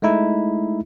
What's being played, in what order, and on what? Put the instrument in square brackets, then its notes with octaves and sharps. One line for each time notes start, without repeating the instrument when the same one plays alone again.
[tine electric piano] G#3 A3 D#4 E4